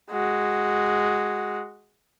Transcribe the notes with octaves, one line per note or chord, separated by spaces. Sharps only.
G#3 F#4